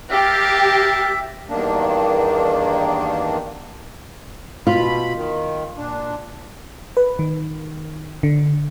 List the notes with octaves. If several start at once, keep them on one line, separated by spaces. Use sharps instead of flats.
G4 A#4 E5 F5 A5
E2 G2 D#3 A#3 D4
B2 F4 B5
D#3
A#2 D4
B4
D#3
D3